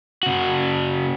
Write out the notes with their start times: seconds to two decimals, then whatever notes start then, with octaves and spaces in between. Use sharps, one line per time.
0.23 C#3 F#4